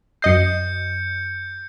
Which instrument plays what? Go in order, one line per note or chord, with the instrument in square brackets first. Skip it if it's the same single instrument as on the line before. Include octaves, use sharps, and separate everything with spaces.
[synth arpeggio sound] F#2 D#5 C7 [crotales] G6 C#7